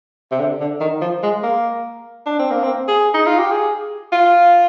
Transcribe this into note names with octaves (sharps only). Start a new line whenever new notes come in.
C3
D3
D3
D#3
F3
G#3
A#3
D4
C4
A#3
C4
G#4
D#4
F4
G4
G#4
F4